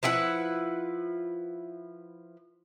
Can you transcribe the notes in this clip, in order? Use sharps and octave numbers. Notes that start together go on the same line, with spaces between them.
F3 E4 B4 F#5